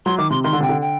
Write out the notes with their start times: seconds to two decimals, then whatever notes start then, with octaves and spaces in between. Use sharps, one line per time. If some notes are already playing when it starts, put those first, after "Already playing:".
0.06 F#3 C6
0.18 D#3 D6
0.31 C3 C6
0.44 D#3 C6
0.53 D3
0.61 C3 G5
0.69 D3
0.82 G5